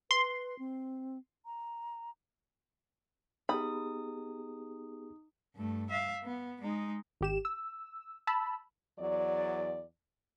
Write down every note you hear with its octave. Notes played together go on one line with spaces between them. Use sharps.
B4 C6
C4
A#5
B3 D#4 G4 G#4 B5 D#6
G2 A3
E5 F5
B3
G#3 D#4
G#1 G4 E7
E6
A5 B5 E6
E2 F#3 D5